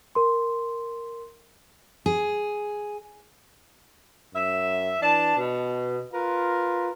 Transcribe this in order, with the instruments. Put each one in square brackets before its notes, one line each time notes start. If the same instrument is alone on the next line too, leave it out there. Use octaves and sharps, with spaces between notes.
[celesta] A#4 C6
[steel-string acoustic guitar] G#4
[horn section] F#2 E5
E3 D4 A5
B2
F4 A#4 B4